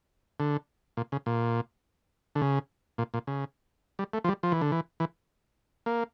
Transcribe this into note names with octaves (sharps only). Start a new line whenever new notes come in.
D3
A#2
C#3
A#2
D3
C#3
A#2
A#2
C#3
G3
A3
F3
G3
F3
E3
D3
E3
E3
A#3